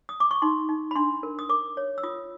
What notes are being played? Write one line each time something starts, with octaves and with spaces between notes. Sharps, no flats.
D#6
D6
C#6
D#4 C6
D#4
B5
D4 C6
A#4
D#6
A#4 D6
C#5
E6
F4 D#6